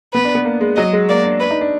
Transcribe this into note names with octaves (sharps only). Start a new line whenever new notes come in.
B3 B4
D4
B3
A#3
G#3
F#3 D#5
G#3
A#3 D5
D4
D4 B4
D#4
D4